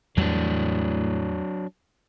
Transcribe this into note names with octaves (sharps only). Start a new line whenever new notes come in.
E2 A2 E3 F#3 G3 D4